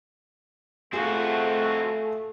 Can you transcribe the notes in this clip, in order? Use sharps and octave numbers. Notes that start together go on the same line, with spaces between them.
A3 C4 F4 F#4 G#4